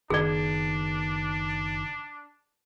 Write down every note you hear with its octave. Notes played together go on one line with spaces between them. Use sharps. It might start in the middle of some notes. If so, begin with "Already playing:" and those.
F#1 D#3 B3 D4 G#4 D5